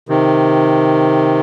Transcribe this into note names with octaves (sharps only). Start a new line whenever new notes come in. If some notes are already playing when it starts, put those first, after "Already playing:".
C3 D#3